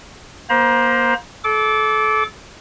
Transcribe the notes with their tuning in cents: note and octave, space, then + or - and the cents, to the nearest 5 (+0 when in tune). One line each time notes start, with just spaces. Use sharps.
A#3 +30 C5 +0 A#5 +30
A4 -30 D6 -15